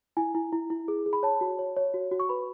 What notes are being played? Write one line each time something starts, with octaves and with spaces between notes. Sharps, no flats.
E4 G#5
E4
E4
E4
G#4
G#4
B5
C#5 A5
F#4
C#5
C#5
F#4
F#4
C#6
B4 B5